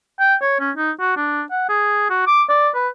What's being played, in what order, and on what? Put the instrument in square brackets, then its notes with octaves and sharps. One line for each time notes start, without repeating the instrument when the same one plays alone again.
[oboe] G5
C#5
C#4
D#4
F#4
D4
F#5
G#4
F#4
D6
D5
B4